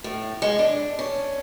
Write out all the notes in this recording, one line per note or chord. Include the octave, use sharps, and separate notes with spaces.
A2
G#3
D4
C#4